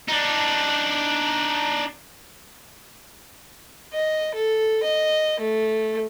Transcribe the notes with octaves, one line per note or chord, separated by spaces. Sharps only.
D4 D#4
D#5
A4
D#5
A3